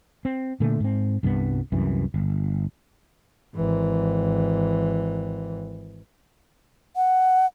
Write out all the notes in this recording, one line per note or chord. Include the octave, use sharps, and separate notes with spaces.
C4
A#2 D3 A3
G#2 C4
C2 G2 E3 B3
C2 F#2 E3
G1
G#1 E3
F#5